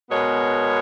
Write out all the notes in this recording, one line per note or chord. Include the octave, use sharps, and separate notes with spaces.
B2 G#3 B3 A#4 C#5